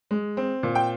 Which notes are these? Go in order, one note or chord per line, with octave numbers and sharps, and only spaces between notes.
G#3
C4
A#2
G5